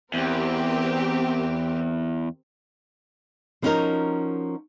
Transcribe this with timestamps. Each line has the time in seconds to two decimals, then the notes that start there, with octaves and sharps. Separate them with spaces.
0.14 E2 C4 G4 A#4
3.62 F3 B3 C#4 D#4 F#4 A#4